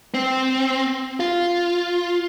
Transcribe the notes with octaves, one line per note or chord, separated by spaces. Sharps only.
C4
F4